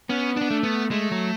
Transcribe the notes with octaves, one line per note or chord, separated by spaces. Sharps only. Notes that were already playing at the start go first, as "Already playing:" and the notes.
B3 C#4
B3 D4
A3
B3
G#3 A3
F#3